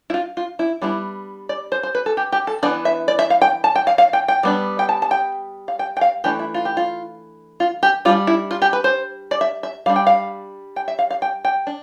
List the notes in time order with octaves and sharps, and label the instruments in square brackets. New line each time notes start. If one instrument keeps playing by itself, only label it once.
[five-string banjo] E4
F4
F4
E4
G3 B3 D4 E4
D5
C5
C5
B4
A4
G4
G4
A4
E3 B3 D4 D5
E5
D5
E5
F5
G5
A5
G5
F5
F5
G5
G5
G3 B3 D4
G5
A5
A5
G5
F5
G5
G5
F5
E3 A3 D4 G4
E4
F4
G4
F4
F4
G4
G3 F4
D4
E4
F4
G4
B4
C5
D5
E5
E5
G3 D4 F5
G5
F5
G5
E5
F5
F5
G5
G5
D4